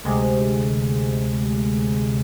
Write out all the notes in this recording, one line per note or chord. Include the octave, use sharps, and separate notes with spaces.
D2 C3 G#3